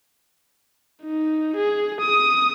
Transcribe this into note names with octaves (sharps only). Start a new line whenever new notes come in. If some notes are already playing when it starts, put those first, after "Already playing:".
D#4
G#4
D#6